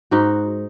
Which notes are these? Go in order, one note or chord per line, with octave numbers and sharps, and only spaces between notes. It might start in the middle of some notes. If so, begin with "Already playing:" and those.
G#2 D#4 F#4